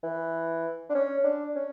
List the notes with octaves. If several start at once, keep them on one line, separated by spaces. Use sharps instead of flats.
E3
D4
C#4
D4
C#4